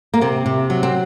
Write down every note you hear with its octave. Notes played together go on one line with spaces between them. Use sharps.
A#3
C3 C4
C3
F#3
C4